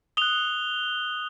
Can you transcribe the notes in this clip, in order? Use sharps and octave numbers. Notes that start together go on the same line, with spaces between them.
D#6 F#6 F7 G7